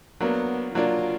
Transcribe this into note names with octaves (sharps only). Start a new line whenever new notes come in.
F#3 A#3 B3 D4
F#3 A#3 D4 F4